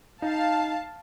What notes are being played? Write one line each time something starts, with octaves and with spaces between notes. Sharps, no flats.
D#4 F5 A5